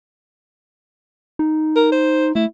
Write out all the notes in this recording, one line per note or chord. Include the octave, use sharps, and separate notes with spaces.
D#4
A#4
C5
A3 E4